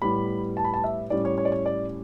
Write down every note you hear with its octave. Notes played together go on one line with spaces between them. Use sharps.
A2 G3 B3 B5
A5
B5
A5
E5
A2 G3 C#4 D5
C#5
C#5
D5
C#5
D5